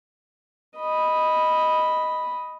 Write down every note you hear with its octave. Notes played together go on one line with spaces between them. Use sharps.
D#5 B5